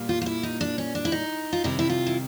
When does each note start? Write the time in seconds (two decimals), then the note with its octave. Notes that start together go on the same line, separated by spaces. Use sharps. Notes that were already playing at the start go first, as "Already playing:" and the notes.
Already playing: A#2 G3 A#3
0.09 F4
0.22 F4
0.26 E4
0.43 D#4
0.61 D4
0.78 C#4
0.95 D4
1.05 E4
1.12 D#4
1.53 F4
1.64 C3 D#3 G3 E4
1.79 E4
1.90 F4
2.06 E4